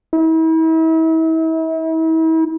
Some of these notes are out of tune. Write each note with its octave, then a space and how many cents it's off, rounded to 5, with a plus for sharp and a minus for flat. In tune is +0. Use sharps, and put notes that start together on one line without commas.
E4 -40